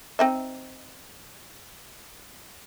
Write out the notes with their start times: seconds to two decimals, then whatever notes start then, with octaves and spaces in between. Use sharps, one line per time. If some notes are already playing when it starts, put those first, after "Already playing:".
0.19 C4 D#4 E5